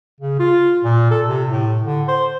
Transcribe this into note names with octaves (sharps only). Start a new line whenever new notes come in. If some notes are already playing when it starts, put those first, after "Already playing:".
C#3
F4
A#2
A4
C3
A2
D3
C5